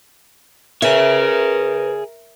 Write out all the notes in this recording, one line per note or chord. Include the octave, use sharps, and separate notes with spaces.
G#4 A#4 B4 C#5 E5